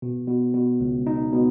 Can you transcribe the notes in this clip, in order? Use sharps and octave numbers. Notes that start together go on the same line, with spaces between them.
B2
B2
B2
C#2
D#4
B2